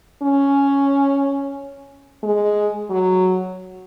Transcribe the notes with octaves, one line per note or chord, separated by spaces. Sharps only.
C#4
G#3
F#3